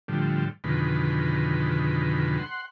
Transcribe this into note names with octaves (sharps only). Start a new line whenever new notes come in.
A2 D3 F3 G3
F2 B2 D3 D#3 G#3 B5
F#5 C6